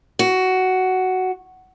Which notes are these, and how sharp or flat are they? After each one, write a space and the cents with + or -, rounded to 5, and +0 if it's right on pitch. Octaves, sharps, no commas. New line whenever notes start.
F#4 +10